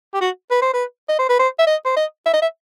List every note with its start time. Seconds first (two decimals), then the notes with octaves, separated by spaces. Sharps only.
0.14 G4
0.21 F#4
0.51 B4
0.62 C5
0.73 B4
1.09 D#5
1.19 C5
1.29 B4
1.39 C5
1.59 E5
1.67 D#5
1.85 C5
1.96 D#5
2.26 E5
2.33 D#5
2.42 E5